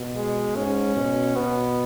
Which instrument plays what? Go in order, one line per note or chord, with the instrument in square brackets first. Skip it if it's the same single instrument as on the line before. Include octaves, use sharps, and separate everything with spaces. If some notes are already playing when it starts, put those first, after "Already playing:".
Already playing: [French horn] B2
[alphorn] G#3
[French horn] G#2 [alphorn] C#4
[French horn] B2
[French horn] B2 [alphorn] B3